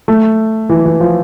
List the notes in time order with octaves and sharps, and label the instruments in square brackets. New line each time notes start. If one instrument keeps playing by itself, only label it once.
[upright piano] A3
E3
E3
F3